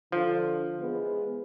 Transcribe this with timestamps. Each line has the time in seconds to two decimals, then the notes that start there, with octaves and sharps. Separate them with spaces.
0.12 D3 F3
0.80 E3 G#3 B3